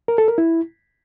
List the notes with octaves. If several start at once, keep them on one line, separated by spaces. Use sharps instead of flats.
A#4
A4
A#4
E4